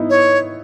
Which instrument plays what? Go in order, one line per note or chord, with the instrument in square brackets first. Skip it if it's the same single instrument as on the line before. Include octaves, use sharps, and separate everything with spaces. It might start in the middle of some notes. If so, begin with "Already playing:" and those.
Already playing: [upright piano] B3 D#4 E4
[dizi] C#5